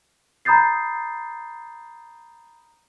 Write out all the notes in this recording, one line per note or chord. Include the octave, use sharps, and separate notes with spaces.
A#5 B5 D#6 G6 A6 C7